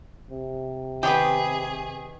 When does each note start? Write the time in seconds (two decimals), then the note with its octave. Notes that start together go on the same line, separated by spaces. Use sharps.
0.31 C3
1.03 D#3 B3 G4 G#4 B4